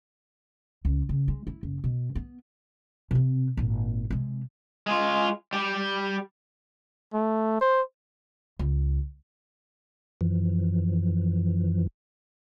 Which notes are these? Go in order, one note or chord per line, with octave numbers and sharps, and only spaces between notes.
C#2
C#3
G#3
E4
F#1
B2
B3
C3 C4
G#1 A#2
C3 G#3
G#3 F4
G3 G4
A3
C5
C#2
F#2 E3 F3